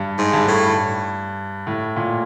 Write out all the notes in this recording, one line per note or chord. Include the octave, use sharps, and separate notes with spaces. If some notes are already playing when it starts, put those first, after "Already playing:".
Already playing: G2
G#2
G2
A2
A2
A#2